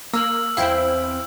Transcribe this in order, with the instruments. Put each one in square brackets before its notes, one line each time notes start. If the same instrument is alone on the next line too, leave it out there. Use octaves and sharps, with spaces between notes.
[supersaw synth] A#3 [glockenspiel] E6 F6 F#7
[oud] E2 C4 C5 [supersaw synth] E4 G5 [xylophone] F5